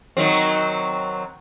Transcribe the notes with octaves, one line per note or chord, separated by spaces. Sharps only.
D#3 F#3 C4